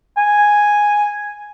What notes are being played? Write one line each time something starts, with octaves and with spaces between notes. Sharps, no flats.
G#5